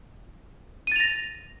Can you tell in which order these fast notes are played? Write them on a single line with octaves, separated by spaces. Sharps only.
D#7 A6 F7 A#6